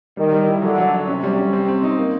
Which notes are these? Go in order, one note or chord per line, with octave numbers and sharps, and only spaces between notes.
D#3 G3
G3
E4
D3 F#3
F#3
D4
C3 C#4
G3
C#4
C3 C4
C4
D#4
A#3